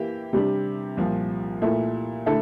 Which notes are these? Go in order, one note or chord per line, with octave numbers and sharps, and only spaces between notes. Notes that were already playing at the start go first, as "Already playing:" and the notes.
Already playing: E3 A#3 E4 G4
C3 G3 D4 G4
C2 A#2 F3
A#2 A3 E4 A4
D3 A3 E4 A4